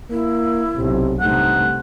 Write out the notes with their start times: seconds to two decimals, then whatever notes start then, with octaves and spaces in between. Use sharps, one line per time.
0.11 A#3 E4
0.76 B1 C3
1.20 G2 C3 A3 D#4 F#5